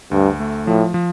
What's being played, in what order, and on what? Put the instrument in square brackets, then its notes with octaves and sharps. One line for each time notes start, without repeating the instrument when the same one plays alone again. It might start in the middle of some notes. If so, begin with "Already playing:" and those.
[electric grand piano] D2 [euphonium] G2
[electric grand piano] A3
[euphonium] A2 [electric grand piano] F3
[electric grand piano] F3